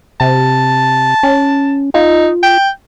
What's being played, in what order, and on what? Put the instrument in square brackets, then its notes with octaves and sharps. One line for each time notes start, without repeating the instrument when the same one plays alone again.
[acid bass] C3 [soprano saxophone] A5
[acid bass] C#4
[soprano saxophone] D#4 [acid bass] F4
[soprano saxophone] G5